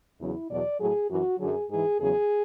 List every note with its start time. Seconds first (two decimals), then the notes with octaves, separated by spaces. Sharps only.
0.19 E2 C#3 F#3 E4
0.49 E2 B2 F#3 D5
0.79 A2 F#3 G#4
1.09 F#2 E3 F#4
1.39 F#2 D3 F#3 G#4
1.68 G#2 E3 G#4
1.99 E2 C#3 F#3 G#4